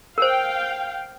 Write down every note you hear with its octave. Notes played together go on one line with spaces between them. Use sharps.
A#4 C5 F5 G5